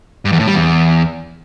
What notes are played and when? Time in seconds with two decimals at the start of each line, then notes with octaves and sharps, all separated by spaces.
0.25 G2
0.32 E2
0.40 A2
0.47 G3
0.54 E2